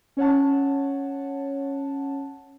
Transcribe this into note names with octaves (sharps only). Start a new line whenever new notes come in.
C#4 C#5 F#5 A5